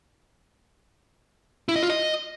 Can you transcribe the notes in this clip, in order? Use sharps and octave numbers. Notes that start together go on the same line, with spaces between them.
E4
D#5
F4
D#5